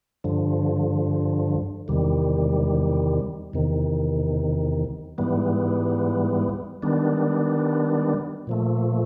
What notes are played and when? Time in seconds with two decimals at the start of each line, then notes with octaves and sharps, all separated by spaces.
0.24 G2 D3 F3
1.88 E2 C3 D#3 G3
3.53 E2 C3 D#3
5.18 G#2 E3 G3 B3
6.82 D#3 G3 B3 D4
8.47 A#2 F3 A3